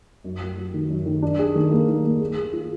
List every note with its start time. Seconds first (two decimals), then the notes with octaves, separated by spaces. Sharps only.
0.24 F#2
0.41 F#3
0.57 F#3
0.74 D#3
0.90 F#2
1.06 D#3
1.22 D4
1.39 G#4
1.55 D#3
1.71 A#3
1.88 D#3
2.04 A#3
2.20 G#4
2.37 G#4
2.53 F4